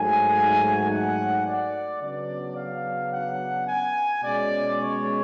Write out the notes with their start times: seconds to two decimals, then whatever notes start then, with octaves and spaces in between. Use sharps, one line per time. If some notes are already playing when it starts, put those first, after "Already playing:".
Already playing: G#2 F#3 A3 G#5
0.91 F#5
1.46 D5
2.01 C#3 F#3 B3 D4 D5
2.56 F5
3.12 F#5
3.67 G#5
4.22 B2 G#3 C#4 D5
4.78 C#5